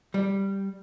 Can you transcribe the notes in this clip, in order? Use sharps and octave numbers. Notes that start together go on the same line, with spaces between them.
G3